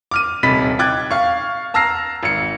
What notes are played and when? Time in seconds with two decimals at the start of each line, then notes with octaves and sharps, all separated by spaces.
0.11 D6 F6 D#7
0.43 D#1 C3 D#4 B5 A6 B6
0.79 G5 D6 F#6 G#6 A6
1.11 F5 C#6
1.74 A5 A#5 E6 F6 A#6 C7
2.23 G#1 C#7